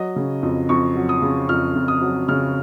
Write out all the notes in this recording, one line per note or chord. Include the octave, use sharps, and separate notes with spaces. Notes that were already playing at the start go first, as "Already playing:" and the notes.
Already playing: F#3 D#5
C#3
F2
F2 C#6
F#3
D#6
C#3
F2 F6
F2
D#6
F#3
C#3 F6